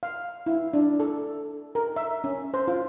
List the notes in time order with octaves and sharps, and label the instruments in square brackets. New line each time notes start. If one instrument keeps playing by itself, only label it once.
[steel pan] F5
E4
D4
A4
A#4
E5
C#4
C5
F4